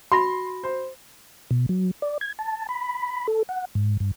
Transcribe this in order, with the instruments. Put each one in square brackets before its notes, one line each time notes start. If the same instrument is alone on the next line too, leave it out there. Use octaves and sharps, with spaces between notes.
[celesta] F#4 B5 A#6 [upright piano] C6
[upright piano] C5
[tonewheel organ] B2
F#3
D5
G#6
A5
B5
A4
F#5
G#2
G2